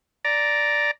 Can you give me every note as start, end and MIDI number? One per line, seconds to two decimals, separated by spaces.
0.25 0.91 74
0.25 0.91 82